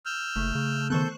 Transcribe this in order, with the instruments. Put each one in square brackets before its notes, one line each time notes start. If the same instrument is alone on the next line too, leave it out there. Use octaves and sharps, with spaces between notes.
[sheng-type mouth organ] E6 F6 G6
[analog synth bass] F#1 [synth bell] A3
[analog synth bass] C#3
[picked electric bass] D#3 B3 [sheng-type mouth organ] A4 G6 [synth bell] C5 C#6 F#6